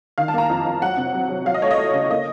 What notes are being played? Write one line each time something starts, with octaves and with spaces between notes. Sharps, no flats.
D#3 F5
A5
A#3 A#5
F2
F2
F#3 F#5
C3
F#3
F#3
F#3 F5
D#5
A3 C#5
D#5
A3
C#3
A#3 D#5